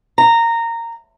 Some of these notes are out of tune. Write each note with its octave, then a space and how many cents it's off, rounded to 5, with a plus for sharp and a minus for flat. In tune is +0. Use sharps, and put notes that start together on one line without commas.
A#5 -15